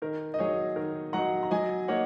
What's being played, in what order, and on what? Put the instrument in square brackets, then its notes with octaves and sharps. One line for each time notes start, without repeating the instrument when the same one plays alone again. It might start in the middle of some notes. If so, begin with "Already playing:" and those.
[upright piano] D#3 A#4
D#5
F#3 D#4 G#4 C#5
D#3 A#4
F#3 D#4 F#5 A#5
A#5
F#3 D#5 G#5
A#3 D#4 C#5 F#5